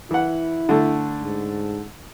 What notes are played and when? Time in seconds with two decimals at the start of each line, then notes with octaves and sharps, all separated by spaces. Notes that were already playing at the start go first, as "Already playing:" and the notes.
0.11 E3 E4 F#5
0.69 D3 A3
1.22 G#2